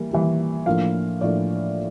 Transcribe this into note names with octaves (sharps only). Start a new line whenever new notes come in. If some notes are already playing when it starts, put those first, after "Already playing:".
Already playing: E3 G3 A#3
E3 G3 A#3
A2 F3 A#3 D4 F5
A2 F3 A#3 D4 D5